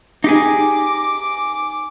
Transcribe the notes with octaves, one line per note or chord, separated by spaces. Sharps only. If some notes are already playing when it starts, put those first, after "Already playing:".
D#4 G4 G#4 D6